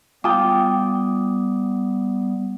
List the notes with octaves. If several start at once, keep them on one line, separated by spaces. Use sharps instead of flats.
G3 B3 F4 G5 D6 D#6